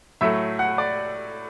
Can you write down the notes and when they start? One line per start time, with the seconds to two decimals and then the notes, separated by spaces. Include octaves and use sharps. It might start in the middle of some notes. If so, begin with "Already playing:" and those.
0.21 A2 F#3 A3 E5
0.59 F#5
0.78 D5